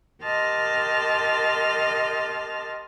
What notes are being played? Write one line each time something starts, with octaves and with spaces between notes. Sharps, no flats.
G4 A#4 D#5 A5 C6 F6